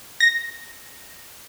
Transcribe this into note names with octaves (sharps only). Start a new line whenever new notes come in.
A#6